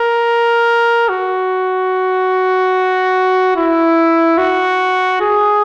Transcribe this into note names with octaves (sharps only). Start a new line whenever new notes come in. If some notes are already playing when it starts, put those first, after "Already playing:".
Already playing: A#4
F#4
E4
F#4
G#4